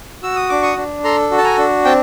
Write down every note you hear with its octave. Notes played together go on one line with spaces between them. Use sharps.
F#4 E6
D#6
D4 D6
C#6 D#6
D4
A4 A#5 C6
F#4
A5
G#5 A#5
D4
C4 G5 A5